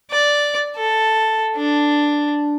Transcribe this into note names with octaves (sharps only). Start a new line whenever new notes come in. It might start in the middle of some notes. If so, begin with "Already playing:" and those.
D5
A4
D4